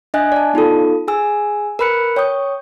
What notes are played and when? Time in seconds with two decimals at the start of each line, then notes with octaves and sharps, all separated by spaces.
0.14 D4 D#5 E5 G#5 F#6
0.32 D5 A5
0.53 B3 D#4 F4 A4
1.08 G#4 G#5 E6
1.79 A#4 B4 B5 F#6 C#7
2.16 C#5 G5 C#6 D#6 G6